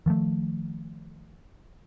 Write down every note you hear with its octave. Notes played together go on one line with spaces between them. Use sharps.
D#3 F3 G3 A3